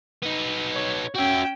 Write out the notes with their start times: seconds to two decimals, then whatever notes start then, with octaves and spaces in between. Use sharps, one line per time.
0.22 B3 D#4
0.73 C#5
1.15 C#4 F#4 E5 G5